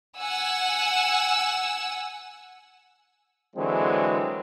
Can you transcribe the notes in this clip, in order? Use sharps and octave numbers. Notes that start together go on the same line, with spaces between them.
F#5 G#5 E6
D3 E3 F#3 G#3 C4